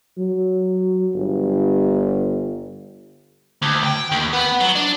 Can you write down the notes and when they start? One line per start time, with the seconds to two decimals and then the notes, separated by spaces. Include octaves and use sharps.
0.18 F#3
1.14 G1
3.62 D2
3.83 G5
4.12 D#2
4.33 B3
4.60 F#3
4.75 D4